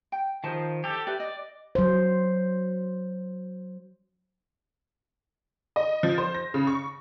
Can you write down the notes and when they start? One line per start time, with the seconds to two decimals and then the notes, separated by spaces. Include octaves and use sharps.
0.12 G5
0.44 D#3 F3 G#4 C5 A5
0.84 G4 A4
1.07 G4 B4 D5 E5
1.20 D#5
1.75 F#3 C5
5.76 D#5
6.03 F3
6.18 C5
6.34 A#6
6.54 C#3
6.67 C#6